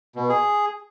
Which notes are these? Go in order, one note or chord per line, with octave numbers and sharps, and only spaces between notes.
B2
G#4